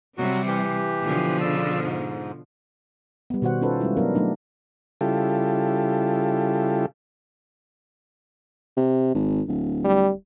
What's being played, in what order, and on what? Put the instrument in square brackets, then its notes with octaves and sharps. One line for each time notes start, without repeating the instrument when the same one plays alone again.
[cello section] C3 G3 [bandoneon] F#3 F#4
[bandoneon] E3 G4
[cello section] B2 D3 F3
[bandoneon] C#3 D5 E6
G#2
[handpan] G3 B3
B2 D#3 F#4 C5 F#5
C#4 D#4 F4 A4 B4 C5
G3 G#3 C#4 E4 F4
F#3 B3 D4 A#4 F5
F#3 A3 D4 D#4
[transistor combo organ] C#3 G3 E4 F4 G4 A4
[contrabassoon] C3
G#1
D1
[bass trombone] G3